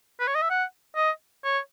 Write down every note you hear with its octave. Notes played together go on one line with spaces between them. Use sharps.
B4
C#5
D#5
E5
F#5
D#5
C#5